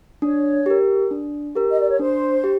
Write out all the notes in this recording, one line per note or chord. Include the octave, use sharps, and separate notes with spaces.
D4 C#5
G4 A#4
D4
G4 A#4
D#5
D5
C#5
D4 C5
G4